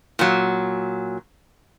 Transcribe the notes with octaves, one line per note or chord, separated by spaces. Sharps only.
A#2 F#3